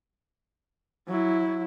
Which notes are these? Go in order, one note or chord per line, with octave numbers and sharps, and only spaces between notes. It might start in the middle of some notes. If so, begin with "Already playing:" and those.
F#3 E4